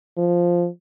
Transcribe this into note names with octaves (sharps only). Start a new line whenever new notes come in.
F3